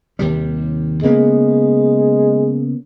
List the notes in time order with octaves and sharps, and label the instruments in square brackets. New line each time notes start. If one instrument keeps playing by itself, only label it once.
[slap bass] D#2 C3 G3
[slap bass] C#3 A#3 B3 [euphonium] G#3